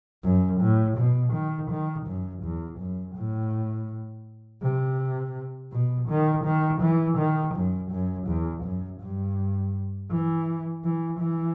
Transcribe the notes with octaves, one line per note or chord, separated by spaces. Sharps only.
F#2
A2
B2
D#3
D#3
F#2
E2
F#2
A2
C3
B2
D#3
D#3
E3
D#3
F#2
F#2
E2
F#2
G2
E3
E3
E3